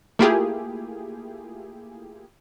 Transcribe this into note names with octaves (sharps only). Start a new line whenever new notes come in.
A3 A#3 E4 F4 G4 G#4